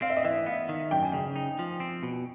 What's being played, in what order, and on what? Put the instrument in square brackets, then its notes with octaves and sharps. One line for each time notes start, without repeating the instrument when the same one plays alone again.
[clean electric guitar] C4 [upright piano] F5
[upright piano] E5
D#5
[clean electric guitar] E3 [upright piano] E5
[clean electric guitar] B3 [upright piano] F5
[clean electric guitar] D#3
[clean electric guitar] F#2 [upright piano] G5
[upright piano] G#5
[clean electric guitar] C#3 [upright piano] G5
[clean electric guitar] D#4
F3
C4
B2